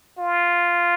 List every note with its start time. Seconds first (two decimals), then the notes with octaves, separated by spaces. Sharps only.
0.19 F4